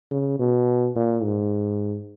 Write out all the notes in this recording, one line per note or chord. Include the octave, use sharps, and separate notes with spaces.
C#3
B2
A#2
G#2